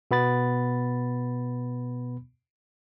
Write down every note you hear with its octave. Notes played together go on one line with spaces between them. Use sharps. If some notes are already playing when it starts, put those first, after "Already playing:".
B2 B3 B5 A6